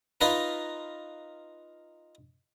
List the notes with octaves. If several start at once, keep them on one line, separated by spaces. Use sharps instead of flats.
D#4 F4 A#4 B4